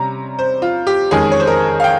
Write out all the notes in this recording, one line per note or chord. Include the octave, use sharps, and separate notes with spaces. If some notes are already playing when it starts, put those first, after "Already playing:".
Already playing: C3 G3 C#4 A#5
C5
F4
G4
F2 D#3 G#3 C#4 G#4
C#5
C5
A#4
F5
G5